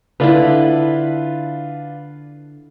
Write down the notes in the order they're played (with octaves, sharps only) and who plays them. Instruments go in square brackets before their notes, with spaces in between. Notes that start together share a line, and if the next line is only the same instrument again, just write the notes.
[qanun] D3 E4 [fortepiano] D4 F4 B4